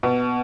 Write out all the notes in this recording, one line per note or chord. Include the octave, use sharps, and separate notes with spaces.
B2